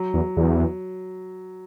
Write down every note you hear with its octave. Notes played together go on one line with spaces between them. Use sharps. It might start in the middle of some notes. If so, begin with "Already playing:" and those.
Already playing: F#3
E2
E2